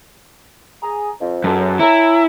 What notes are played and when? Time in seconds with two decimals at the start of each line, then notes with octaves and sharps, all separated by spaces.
0.82 G#4 A#5
1.20 F2
1.44 C#2 F#2 A4
1.79 E4 C#5 G#5 A#5